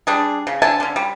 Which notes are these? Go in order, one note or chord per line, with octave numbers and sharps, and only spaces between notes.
G3 D4 G#4
C#3
D3 E5 G#5 A5
D3 C#4
G3